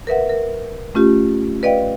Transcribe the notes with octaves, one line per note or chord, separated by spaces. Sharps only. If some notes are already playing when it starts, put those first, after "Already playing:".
A#4 B4 E5 F#5
A#4
A3 C#4 F4 G4
B4 D5 D#5 F5 G5